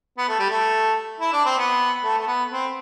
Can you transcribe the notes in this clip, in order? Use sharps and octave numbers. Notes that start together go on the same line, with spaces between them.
B3
A3
G3
A3
E4
D4
C4
B3
A3
A3
B3
C4